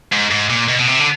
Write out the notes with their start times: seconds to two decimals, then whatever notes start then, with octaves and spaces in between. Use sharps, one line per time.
0.12 G#2
0.31 G#2
0.50 A#2
0.69 B2
0.79 B2
0.88 C3
0.99 D3